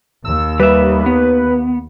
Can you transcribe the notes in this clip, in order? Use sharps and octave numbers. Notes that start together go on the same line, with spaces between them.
D#2 E6
G3 B4 E5
B3